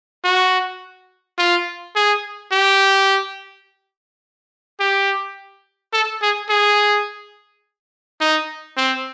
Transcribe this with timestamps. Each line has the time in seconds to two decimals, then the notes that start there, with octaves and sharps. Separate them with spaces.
0.24 F#4
1.38 F4
1.96 G#4
2.52 G4
4.80 G4
5.93 A4
6.22 G#4
6.50 G#4
8.21 D#4
8.77 C4